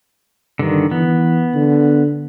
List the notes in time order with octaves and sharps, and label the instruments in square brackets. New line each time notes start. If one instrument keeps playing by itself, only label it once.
[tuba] G2 [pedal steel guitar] D3 D#3
[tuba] E3 [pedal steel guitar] B3
[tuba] D3